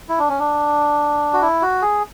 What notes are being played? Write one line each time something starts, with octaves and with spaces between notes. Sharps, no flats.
E4
D4
C#4
D4
F#4
E4
F#4
G#4